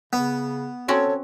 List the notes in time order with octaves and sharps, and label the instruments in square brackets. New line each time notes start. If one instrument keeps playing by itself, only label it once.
[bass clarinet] C#3 [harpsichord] B3
[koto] C4 C#4 F#4 [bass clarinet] A4 [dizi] C#5